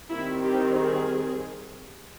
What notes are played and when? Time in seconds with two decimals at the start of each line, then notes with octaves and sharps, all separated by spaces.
0.10 D#3 G3 C4 E4
0.42 G4
0.73 G#4